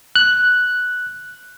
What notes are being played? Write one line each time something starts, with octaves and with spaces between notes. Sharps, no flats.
F#6